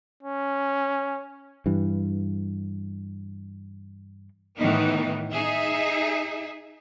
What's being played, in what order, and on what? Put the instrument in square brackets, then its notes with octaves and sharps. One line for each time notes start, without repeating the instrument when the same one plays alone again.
[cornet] C#4
[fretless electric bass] G2 E3
[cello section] A2 D#3 E3 B3 D#4
D#4 G#4 E5